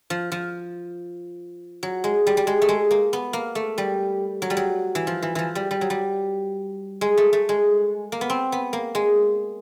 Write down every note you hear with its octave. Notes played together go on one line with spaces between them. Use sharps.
F3
F3
F#3
G#3
G3
G3
G#3
A3
G#3
A#3
B3
A#3
A3
G3
F#3
G3
F#3
E3
F3
E3
E3 F3
G3
G3
F#3
G3
G#3
A3
A3
G#3
A#3
B3
C4
B3
A#3
G#3